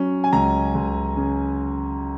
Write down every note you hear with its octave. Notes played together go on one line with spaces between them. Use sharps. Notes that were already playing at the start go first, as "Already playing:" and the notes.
Already playing: F#3 C#4
G#5
C#2 A#5
C#2
C#3